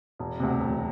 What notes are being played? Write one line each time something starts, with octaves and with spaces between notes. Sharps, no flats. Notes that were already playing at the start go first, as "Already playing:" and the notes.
E1
D2 C3
E1